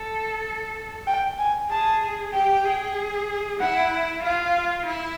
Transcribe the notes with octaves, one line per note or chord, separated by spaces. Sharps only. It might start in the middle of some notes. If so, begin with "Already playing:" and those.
Already playing: A4
G5
G#5
G#4 A5
G4 G5
G#4
E4 F#5
F4 F5
E4